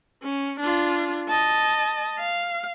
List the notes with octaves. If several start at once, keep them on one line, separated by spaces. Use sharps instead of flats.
C#4
D4 F4
D#5 A5
F5